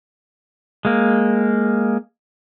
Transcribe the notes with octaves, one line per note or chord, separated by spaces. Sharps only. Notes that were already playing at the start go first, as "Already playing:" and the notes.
G#3 A#3